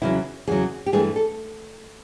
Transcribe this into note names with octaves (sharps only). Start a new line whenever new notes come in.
E2 C#3 F#3 E4
E2 C#3 F#3 G#4
G4
G2 E3 A3 G#4
A4